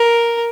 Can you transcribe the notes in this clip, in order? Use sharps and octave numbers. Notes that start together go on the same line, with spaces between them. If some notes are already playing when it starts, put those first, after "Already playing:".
Already playing: A#4